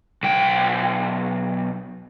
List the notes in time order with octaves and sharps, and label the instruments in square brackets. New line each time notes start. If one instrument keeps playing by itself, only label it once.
[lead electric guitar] B1 G5